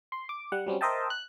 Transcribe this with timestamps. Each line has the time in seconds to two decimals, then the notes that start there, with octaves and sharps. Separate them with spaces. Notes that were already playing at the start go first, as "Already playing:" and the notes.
0.12 C6
0.29 D6
0.52 G3 F#5
0.66 F#3 G3 C4 C#4
0.81 A#4 C5 D#5 E5 G5 A5
1.10 F#6